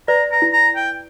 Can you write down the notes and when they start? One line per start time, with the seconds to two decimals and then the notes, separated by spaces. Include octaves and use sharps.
0.08 B4 D5 A#5
0.32 A#5
0.42 E4
0.53 A#5
0.76 G5